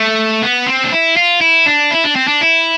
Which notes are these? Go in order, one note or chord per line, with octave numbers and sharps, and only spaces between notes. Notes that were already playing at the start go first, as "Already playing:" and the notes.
Already playing: A3
B3
C4
D4
E4
F4
E4
D4
E4
D4
C4
D4
E4